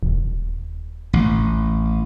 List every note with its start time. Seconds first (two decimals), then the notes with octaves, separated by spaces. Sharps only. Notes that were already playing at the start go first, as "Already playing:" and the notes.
0.03 D#1
1.13 A1